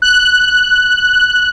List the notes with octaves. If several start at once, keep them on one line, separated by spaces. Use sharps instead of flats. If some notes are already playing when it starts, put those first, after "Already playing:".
F#6